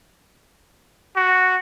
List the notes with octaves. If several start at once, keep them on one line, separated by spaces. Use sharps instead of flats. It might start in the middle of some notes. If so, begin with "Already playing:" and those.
F#4